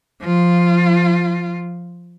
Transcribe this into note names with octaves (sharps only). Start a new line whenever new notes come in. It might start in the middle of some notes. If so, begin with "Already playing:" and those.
F3 F4